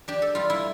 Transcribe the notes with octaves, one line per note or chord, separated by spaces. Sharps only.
D4 G4
A4
G3 F4
E4